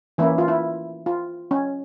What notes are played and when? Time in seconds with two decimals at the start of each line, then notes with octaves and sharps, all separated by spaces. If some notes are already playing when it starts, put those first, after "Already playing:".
0.18 E3 A#3 C#4 E4
0.38 F4
0.48 E4
1.06 F4
1.51 C#4